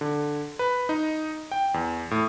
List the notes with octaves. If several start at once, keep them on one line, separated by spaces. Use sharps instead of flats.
D3
B4
D#4
G5
E2
A2